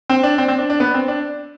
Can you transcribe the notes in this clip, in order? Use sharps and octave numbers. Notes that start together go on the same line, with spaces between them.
C4
D4
C4
C4
D4
D4
B3
C4
D4